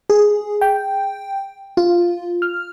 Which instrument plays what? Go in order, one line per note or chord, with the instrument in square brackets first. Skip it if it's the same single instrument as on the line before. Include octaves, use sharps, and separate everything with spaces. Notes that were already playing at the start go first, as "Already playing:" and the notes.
[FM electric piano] G#4
G5
F4
F6